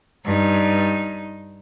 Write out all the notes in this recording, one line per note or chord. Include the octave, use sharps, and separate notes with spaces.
G2 D#4